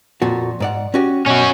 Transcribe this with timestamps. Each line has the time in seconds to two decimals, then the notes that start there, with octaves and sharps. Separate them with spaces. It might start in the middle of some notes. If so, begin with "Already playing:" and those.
0.22 F2 A#2 F#4
0.60 G#2 D5 F#5
0.94 C#4 F#4 G4
1.26 B2 C#4 F#4